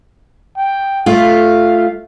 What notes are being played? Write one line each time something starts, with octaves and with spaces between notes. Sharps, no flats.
G5
A3 F4 F5